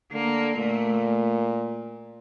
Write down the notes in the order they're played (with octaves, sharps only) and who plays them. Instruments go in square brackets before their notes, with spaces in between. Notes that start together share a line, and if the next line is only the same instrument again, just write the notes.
[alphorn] D3 [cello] A#3
[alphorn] A#2 [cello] A3